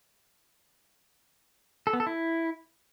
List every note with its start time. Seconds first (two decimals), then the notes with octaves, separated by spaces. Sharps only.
1.87 A4
1.93 B3
2.00 A4
2.07 E4